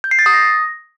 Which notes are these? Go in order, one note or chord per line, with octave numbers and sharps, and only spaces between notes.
G6
C7
A6
D#6
A#6